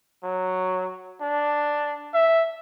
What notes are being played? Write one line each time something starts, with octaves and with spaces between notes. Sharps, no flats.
F#3
D4
E5